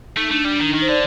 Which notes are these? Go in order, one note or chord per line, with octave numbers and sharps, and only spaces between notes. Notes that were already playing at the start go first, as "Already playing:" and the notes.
A3 D#4
A3 D4
G3 D4
D4
D#3 D#4
D#3 D#4
C5
D3 D5